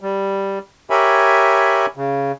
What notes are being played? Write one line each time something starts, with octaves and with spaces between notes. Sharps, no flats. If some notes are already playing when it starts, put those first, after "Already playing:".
G3
G4 A#4 C#5 E5 G#5 B5
C#3